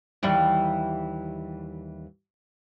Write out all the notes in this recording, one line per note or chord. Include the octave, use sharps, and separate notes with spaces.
D#2 E3 G3